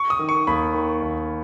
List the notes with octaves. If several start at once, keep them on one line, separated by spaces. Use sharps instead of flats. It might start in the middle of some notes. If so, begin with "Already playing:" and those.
Already playing: C#6
D#6
D#3
C#6
D#2 B5
D#3
D#2